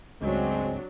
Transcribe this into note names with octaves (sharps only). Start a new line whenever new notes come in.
C#2 G2 F#3 G#3 C4 D4